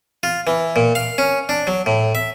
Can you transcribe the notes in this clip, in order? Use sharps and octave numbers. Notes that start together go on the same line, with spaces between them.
F4
E3
A#2
F5
C#4
D4
F#3
A2
E5